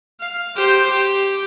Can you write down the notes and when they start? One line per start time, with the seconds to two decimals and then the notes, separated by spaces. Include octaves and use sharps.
0.20 F5
0.56 G4 C5
0.90 G4